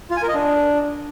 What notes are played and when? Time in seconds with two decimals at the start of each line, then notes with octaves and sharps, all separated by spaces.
0.11 F4
0.17 G#5
0.23 A#4
0.29 D#5
0.34 D4